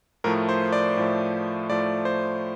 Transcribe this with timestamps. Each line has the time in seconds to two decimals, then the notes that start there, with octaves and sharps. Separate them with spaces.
0.24 A2 F3 A3 A#4
0.49 C5
0.73 D5
0.97 A2 F3 A3
1.69 A2 F3 A3 D5
2.05 C5